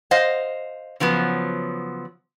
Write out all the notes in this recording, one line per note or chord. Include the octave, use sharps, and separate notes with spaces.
C5 D#5 F5
C#3 F3 F#3 B3